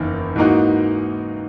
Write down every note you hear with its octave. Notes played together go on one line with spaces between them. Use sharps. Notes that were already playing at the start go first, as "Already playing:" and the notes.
Already playing: F#1 E2 D#3 A#3
G#2 E3 A#3 D#4 F#4